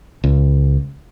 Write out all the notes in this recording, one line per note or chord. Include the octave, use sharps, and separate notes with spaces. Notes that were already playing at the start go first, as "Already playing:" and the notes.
C#2